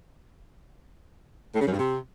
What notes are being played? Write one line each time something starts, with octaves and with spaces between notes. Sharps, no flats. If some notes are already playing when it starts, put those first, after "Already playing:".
A2
C#3
F#2
G2
C3